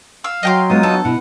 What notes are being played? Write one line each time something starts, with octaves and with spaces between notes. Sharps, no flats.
F5 E6
F#3 D#5 G5 C6
G#3 B3 C#4 D#4 F4 D#6
D4 A4
B2 E4 F#5